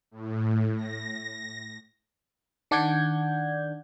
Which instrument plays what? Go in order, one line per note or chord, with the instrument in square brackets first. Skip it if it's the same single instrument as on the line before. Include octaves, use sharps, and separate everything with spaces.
[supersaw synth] A2
A#6
[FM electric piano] D#3 D4 D5 F#5 G6 G#6